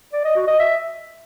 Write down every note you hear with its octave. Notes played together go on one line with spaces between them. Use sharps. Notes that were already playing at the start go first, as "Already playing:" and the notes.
D5
D#5
F#4
D#5
E5